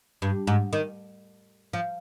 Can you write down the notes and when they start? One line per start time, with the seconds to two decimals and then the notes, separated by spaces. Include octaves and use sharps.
0.22 G2
0.47 G#2
0.73 D#3
1.73 F3